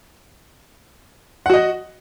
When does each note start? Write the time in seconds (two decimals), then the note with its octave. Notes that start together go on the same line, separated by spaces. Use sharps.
1.46 F#5
1.50 F#4
1.53 D#5